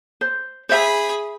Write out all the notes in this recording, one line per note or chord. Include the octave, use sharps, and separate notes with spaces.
C5
G#4 C5 E5 B5